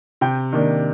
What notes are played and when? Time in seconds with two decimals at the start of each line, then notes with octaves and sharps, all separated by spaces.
0.21 C3 G5
0.53 D#3 A#3 D4